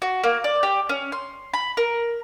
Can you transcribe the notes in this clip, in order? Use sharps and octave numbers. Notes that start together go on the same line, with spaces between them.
F#4
A#3
D5
G4
C#4
C6
B5
A#4